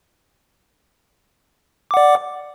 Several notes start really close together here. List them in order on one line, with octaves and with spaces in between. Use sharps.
D6 F#5 D5